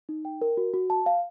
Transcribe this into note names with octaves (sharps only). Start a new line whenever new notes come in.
D#4
G5
A#4
F#4
F#4
A5
F5